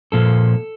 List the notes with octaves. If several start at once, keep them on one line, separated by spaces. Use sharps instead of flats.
A#2 F3 A#3 A4